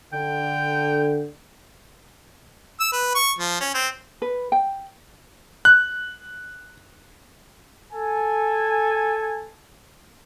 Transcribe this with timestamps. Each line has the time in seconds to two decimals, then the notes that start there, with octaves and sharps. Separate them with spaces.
0.13 D3 G5
2.80 E6
2.92 B4
3.15 C#6
3.39 F3
3.60 C#4
3.74 C4
4.22 B4
4.52 G5
5.65 F#6
7.92 A4 G#5